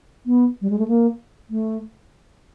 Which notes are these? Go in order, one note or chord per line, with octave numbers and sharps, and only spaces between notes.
B3
G3
G#3
A3
A#3
A3